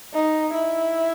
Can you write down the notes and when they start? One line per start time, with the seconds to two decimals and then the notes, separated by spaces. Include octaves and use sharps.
0.14 D#4
0.53 E4